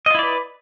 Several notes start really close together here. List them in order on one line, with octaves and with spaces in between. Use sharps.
D#5 F4 E4 D5 B4